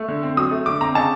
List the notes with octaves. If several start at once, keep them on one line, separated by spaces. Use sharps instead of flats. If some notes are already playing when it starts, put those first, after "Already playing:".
Already playing: A3
D3
C4
F#3 D#6
A3
D3 D6
C4 A#5
C#3 A5